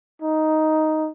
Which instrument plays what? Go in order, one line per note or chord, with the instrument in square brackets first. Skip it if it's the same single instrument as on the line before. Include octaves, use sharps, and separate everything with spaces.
[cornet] D#4